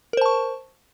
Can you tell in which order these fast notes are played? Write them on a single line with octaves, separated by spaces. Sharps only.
A#4 C5 A5 C#6